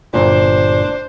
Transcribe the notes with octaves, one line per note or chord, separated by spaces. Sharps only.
G1 A#2 D4 C5